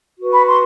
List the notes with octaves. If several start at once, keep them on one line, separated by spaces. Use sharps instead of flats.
F#4 B4
B5
C6